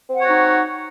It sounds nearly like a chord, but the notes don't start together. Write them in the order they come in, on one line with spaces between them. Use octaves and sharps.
C4 F#5 C#5 F#4 D#4